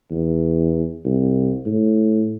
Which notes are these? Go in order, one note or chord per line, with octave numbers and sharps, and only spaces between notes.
E2
C2
A2